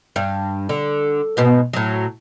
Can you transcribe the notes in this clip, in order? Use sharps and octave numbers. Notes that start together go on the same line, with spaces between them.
G2
D3
G#2 B2 B3
A2 F#3